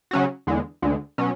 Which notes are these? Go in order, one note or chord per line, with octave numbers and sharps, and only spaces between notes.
C#3 F#3 C#4 F#4
E2 D3 G#3
D2 D3 G#3
B2 F#3 C#4